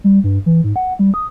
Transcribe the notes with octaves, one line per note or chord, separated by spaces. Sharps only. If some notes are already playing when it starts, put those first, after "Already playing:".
G3
G2
E3
G#2
F#5
G3
D#6